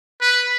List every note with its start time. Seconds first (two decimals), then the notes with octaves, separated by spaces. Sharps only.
0.21 B4